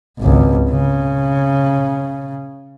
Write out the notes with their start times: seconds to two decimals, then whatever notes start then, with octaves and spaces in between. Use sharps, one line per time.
0.19 G#1 C#2
0.70 C#3